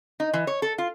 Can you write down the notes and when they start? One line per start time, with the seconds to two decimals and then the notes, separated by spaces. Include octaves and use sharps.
0.20 D#4
0.34 E3
0.47 C#5
0.62 A4
0.78 F4